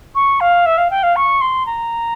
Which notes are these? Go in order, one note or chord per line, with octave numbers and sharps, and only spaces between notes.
C#6
F5
E5
F5
G5
F5
C#6
C6
A#5